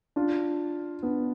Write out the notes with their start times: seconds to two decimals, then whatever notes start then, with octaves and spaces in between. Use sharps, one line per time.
0.16 D4 F4
1.03 B3 D4